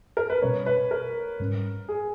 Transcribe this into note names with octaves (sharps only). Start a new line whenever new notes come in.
A#4
B4
B2 G3 C#4 C#5
B4
A#4
G#2 G3 C#4
G#4